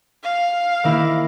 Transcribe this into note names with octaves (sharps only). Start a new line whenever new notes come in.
F5
D#3 A#3 E4